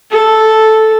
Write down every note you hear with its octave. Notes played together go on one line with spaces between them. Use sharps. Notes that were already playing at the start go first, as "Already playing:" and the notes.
A4